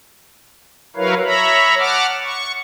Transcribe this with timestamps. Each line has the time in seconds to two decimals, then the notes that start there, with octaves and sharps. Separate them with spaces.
0.96 F#3 E4 A#4 B4 C#5 F5
1.24 C#5 E5 A#5 B5
1.79 F#5 A5 D6 F6
2.24 C#6